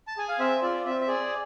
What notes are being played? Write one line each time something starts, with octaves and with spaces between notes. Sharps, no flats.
A5
G#4 G#5
F5
C4 E5
F4 D5
C4 E5
E5
G#4 D5